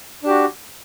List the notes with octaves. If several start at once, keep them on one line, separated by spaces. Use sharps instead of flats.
D4 F#4 G4